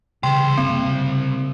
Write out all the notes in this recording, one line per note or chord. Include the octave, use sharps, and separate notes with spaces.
C2 C#3 E3 C5 G5 C6
F#1 A#3 C4
C#3